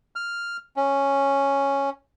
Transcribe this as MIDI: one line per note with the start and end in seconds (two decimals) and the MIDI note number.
0.16 0.57 89
0.77 1.90 61